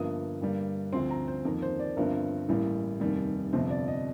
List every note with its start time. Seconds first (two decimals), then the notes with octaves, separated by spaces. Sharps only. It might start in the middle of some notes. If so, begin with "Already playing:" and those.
Already playing: G1 G2 F3 A#3 D#6
0.41 G2 D3 G3 A#3
0.93 D2 D3 F3 C4 C6
1.10 A#5
1.28 C5
1.45 F2 D#3 A#3 A#4
1.62 C5
1.79 D5
1.97 G1 G2 F3 C4 A#4
2.49 A1 A2 G3 A#3
3.00 F1 D#2 D#3 G3
3.53 G1 F2 C3 C5
3.70 D5
3.88 D#5